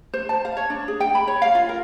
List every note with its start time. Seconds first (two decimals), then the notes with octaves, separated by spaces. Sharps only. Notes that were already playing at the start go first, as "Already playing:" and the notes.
0.14 C5
0.29 A5
0.45 F5
0.57 C#5
0.70 D4
0.88 G#4
1.00 G5
1.15 B5
1.28 C#5
1.42 F5
1.55 F4
1.69 A#4